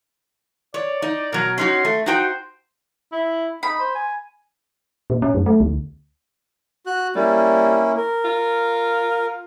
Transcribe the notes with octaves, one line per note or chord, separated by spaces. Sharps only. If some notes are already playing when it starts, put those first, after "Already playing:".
C#5 D5
D#4
B2 F#3 A#4
C#4 D#4 F#4 C6
A3
D#4 F#4 C5 G5
E4
D#4 B5
C5
G#5
A#2
C#4
F#2
A3
D2
F#4 F#6
G3 A#3 C#4 E4
A#4
F4